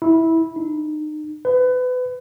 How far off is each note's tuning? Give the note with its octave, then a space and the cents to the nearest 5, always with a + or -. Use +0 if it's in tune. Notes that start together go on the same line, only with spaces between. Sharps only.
E4 -15
D#4 -35
B4 +30